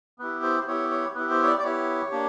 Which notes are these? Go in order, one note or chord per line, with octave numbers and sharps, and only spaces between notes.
B3 E4 G4 B4
C5
B3 E4 G4 C#5
C#5
B3 E4 G4 B4
C5
C#5
D5
D5
B3 E4 G4 C#5
A#3 D4 G4